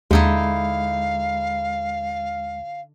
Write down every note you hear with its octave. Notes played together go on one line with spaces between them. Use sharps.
D#2 D3 G#3 D#4 E4 F5